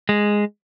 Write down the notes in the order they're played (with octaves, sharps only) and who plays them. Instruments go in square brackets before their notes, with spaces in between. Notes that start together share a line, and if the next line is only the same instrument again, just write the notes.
[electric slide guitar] G#3